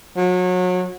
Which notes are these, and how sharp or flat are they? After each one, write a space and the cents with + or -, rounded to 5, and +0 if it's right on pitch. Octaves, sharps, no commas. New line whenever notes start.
F#3 -30